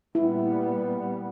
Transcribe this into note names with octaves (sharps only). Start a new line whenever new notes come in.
A#2 G3 B3 E4